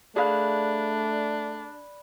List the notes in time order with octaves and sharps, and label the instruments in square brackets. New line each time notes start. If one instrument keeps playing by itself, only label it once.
[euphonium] A3 [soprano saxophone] D4 [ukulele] G#4 F5 [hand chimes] D5 B5 F#6